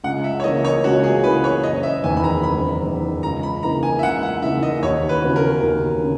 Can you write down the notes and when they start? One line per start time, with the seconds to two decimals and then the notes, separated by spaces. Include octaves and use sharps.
0.04 C#2 F#5
0.24 E5
0.40 C#5
0.44 C#3 E3 A#3 E4 D#5
0.65 C#5
0.84 C#2 F#4
1.04 G#4
1.24 C#3 E3 A#3 E4 B4
1.44 C#5
1.64 F#1 D#5
1.83 E5
2.04 E2 D#3 G#5
2.17 B5
2.24 A#5
2.43 F#1 B5
2.83 E2 D#3
3.23 C#2 A#5
3.43 B5
3.63 C#3 E3 A#3 D#4 A#5
3.83 G#5
3.99 E5
4.03 C#2 F#5
4.23 F#5
4.42 C#3 E3 A#3 D#4 E5
4.63 D#5
4.83 D#2 C#5
5.09 B4
5.22 C#3 E3 B3 F#4
5.36 A#4
5.62 D#2
6.02 C#3